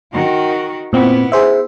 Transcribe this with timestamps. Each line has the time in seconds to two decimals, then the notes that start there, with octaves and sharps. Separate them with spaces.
0.13 D#3 F#4
0.93 A#2 B3 C4 E4
1.32 G#4 C5 E5